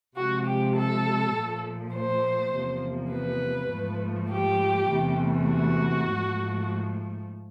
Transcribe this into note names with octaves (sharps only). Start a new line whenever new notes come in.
C3 F3 G#3 F#4
G4
A4
A#2 F3 A3
C5
E2 C3 F3 A#3
B4
G#2 F3 A3
G4
E2 C3 E3 A3
F#4
G#2 F3 A3